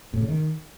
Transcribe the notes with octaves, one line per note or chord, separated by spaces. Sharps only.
A2
C#3
D#3